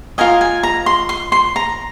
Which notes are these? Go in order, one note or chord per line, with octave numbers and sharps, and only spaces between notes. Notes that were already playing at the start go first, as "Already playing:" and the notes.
F4 A#4 D#5 G#5
G#5
A#5
C6
C6
C6
A#5